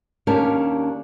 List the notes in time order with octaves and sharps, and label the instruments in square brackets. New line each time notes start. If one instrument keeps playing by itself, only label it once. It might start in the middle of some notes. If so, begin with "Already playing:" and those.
[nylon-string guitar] D#2 C#4 D4 G4 A#4 A5